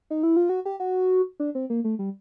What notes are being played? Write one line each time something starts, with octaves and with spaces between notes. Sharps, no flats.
D#4
E4
F4
F#4
G4
F#4
D4
C4
A#3
A3
G3